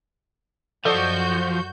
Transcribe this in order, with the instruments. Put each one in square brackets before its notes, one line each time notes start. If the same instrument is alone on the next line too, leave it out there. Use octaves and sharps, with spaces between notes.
[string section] F#2 F#4 G6 [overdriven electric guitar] F3 [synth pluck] A4 D5 D#5